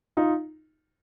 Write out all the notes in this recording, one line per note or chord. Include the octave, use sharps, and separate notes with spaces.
D#4 F4